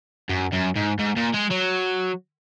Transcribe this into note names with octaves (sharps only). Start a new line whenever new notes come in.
F#2
F#2
G#2
G#2
A#2
G#3
F#3